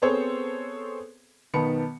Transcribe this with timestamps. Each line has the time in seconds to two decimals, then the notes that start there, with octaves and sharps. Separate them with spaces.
0.02 B3 C4 G#4 A4 C5 C#5
1.54 B1 D#3 B3 A5 B5 C#7